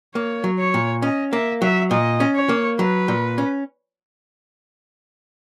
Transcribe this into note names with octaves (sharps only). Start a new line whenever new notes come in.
A#3 C#5
F#3
C#5
A#2
C#4 D#5
A#3 E5
F#3 E5
A#2 D#5
C#4
C#5
A#3
F#3 B4
A#2
C#4